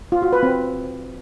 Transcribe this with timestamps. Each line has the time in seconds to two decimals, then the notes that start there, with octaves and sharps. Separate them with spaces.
0.12 F4
0.22 F#4
0.33 B4
0.43 C4